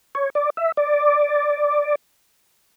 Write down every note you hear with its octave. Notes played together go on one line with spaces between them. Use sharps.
C#5
D5
E5
D5